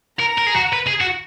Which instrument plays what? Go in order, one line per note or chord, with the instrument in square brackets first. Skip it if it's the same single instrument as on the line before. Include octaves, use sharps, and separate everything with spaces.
[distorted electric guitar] A#4 [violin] A#5
[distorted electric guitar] A#4
G#4
F#4
B4
G#4
F#4